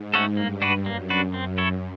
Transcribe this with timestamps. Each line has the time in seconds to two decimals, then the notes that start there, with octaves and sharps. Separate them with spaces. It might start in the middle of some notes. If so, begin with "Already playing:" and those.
Already playing: G#2
0.14 A3 C#4 F#4 A4
0.37 G2 A#3
0.62 D4 F#4 B4
0.86 F#2 A#3
1.10 D4 F#4 B4
1.34 C4
1.58 E4 A4 C#5